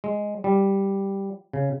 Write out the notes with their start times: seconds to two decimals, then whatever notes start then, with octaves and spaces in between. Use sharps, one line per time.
0.04 G#3
0.44 G3
1.53 C#3